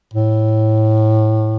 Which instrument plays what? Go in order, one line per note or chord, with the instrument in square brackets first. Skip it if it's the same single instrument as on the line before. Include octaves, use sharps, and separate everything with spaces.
[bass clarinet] A2